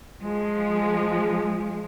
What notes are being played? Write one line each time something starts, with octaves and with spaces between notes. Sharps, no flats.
F3 G#3